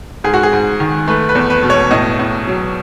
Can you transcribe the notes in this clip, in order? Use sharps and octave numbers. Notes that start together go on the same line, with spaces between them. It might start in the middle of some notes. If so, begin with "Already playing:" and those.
G#2 G#4
F#4
G#4
G#2
D#3
A3 B4
B4
E2
B4
B2
C#5
A2 D#5
A2
F#3